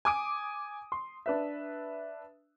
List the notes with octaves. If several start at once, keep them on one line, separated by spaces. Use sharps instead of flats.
G#5 D6 D#6 D7 D#7
C6
D4 B4 E5